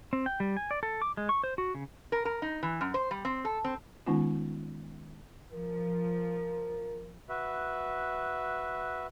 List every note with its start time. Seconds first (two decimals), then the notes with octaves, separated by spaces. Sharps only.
0.13 C4
0.26 G5
0.40 G3
0.57 G#5
0.71 D5
0.83 A4
1.02 D6
1.17 G#3
1.29 C#6
1.44 C5
1.58 F#4
1.75 C#3
2.12 A#4
2.25 A#4
2.42 D#4
2.63 E3
2.81 F#2
2.94 C5
3.11 G3
3.25 C4
3.45 A4
3.64 C4
4.06 D#3 G#3 B3 C#4 D#4 F4
5.53 F3 A#4
7.29 F#4 B4 E5